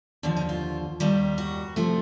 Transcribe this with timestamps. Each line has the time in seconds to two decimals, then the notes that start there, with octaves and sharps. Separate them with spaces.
0.23 D#2 D3 F3 D4
0.37 D#4
0.49 F4
1.00 D#2 D#3 G3
1.38 F#4
1.76 C3 F3 A3